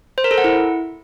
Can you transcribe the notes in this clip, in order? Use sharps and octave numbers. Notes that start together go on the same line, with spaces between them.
C5
A#4
A4
F#5
E4